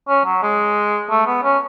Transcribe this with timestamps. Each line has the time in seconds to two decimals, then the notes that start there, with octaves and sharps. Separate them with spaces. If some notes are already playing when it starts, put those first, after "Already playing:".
0.09 C#4
0.25 F#3
0.43 G#3
1.10 A3
1.27 B3
1.43 C#4